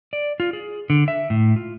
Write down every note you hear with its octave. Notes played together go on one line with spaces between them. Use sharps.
D5
F4
G#4
D3
E5
A2
F4